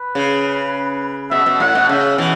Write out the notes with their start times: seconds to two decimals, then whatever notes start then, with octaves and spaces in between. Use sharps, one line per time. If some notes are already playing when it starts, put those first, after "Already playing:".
Already playing: B4
0.15 C#3
1.31 B2 E5
1.46 B2
1.60 A2 F#5
1.75 B2
1.89 C#3 E5
2.18 B2 E3